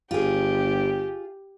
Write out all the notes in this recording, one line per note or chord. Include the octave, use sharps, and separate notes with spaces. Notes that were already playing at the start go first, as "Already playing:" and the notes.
G1 F4 G4 G#4